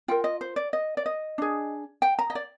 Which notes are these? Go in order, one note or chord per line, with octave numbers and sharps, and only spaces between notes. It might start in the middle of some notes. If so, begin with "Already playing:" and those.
F4 A#4 G5
D#5
C5
D5
D#5
D5
D#5
D4 G#4
G5
A#5
D#5
D5